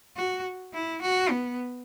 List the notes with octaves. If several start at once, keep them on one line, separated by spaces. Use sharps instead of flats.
F#4
E4
F#4
B3